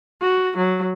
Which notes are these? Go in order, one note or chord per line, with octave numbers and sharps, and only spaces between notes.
F#4
F#3